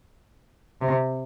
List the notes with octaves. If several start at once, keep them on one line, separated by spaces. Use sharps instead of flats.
C3